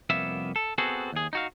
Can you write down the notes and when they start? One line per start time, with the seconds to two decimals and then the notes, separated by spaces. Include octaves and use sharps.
0.10 C2 F2 A#3 B3 E5
0.56 A4
0.78 B3 C4 F#4 G#4 A4
1.13 D#2 G#4
1.33 D#4 F#4 F5